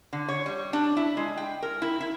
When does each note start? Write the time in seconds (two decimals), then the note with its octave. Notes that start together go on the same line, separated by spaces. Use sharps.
0.13 D3
0.28 C#5
0.46 G3
0.73 D4
0.97 E4
1.17 G#3
1.37 G5
1.62 A#4
1.82 E4
2.01 E4